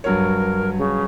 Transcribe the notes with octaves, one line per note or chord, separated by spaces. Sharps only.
G2 F#3 A#4 C#5
C#3